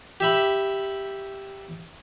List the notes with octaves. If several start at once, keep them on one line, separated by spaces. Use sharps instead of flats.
G4 E5 B5